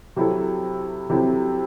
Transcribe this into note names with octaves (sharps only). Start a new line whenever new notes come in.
C3 F#3 C4 E4 A4
C3 F#3 C4 E4 A4